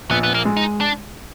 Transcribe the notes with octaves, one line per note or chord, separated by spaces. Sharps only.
A#1 B3
B3
A#3
G#3
D#4
D4